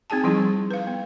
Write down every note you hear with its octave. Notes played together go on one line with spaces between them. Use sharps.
C4 D#4 G#4 G#5 A5
F3 G3 E4 G#4
B4 F5
B3